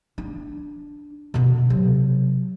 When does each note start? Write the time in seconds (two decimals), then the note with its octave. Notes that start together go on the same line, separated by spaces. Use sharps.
0.18 D4
1.34 B2 D3
1.70 C3 F#3